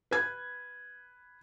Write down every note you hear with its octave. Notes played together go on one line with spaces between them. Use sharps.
B4 G#6